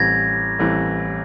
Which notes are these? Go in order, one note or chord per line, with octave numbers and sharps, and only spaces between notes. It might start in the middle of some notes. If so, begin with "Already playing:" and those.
Already playing: A1 A2 E3 G3 C4 G#6 A#6
A1 A2 E3 G3 C4